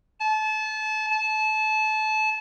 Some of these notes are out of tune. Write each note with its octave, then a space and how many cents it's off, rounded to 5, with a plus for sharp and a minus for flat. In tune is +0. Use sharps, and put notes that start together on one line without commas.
A5 -30
A5 -25